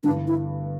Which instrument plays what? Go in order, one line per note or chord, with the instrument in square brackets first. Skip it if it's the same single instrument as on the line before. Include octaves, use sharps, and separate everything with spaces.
[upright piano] G1 G2 E3 G3 [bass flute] D4
[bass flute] E4